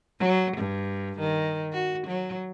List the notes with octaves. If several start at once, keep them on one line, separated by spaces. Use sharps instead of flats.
F#3
G2
D#3
F#4
F#3